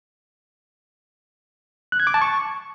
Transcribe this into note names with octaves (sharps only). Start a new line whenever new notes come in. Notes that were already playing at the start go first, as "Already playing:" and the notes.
F#6
G#6
D6
A5
C#6